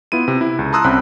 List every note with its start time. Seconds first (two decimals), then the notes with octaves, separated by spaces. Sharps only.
0.12 B3 E4 F4 D#7
0.28 C3
0.41 E4
0.59 C#2
0.72 A5 A#5 C6 D#6 E6 F#6
0.84 C2 C4 C#4 B5 F#6